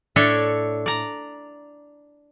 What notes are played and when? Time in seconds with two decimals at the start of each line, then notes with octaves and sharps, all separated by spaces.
0.16 A2 D4 A4 C#5 E5
0.86 D5 A#5